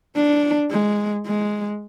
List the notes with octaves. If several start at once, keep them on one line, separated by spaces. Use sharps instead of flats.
D4
G#3
G#3